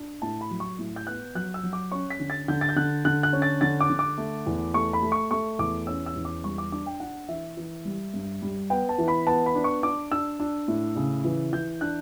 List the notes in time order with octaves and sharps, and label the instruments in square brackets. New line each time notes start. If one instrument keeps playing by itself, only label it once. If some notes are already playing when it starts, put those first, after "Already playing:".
Already playing: [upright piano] D4
A2 A5
B5
F#3
C#6
A2
G6
B3 F#6
F#3 F#6
E6
F#3
D6
C#4 C#6
B6
D3
A6
D3 G6
A6
G6
D3 F#6
D3 F#6
F#6
C#4
A6
D3 A6
D6
D3
D6
A3
E2
A3 C#6
B5
A3
C#6
A3 C#6
E2 D6
C#4 E6
E6
E2
D6
G3 C#6
D6
D4 D6
G5
D4 F#5
E3 E5
E3
G3
G2
G3
B3 G5
A5
E3
B5
B3 A5
B5
D4
C#6
D4 D6
D4 E6
D4
A2
C#3
E3
E3 G6
D4 F#6